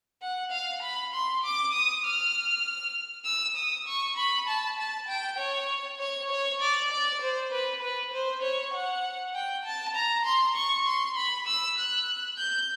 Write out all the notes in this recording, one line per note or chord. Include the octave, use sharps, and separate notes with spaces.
F#5
F5
B5
C6
D6
D#6
F6
E6
D#6
C#6
B5
A5
A5
G5
C#5
C#5
C#5
D5
D5
C5
B4
B4
C5
C#5
F#5
G5
A5
A#5
C6
C#6
C6
B5
E6
F#6
G6